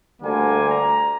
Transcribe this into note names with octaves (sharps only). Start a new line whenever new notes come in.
D2 D3 G3 A#3 G#5
A#5